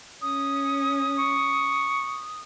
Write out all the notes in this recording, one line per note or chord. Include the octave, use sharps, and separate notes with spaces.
C#4 D#6
C#6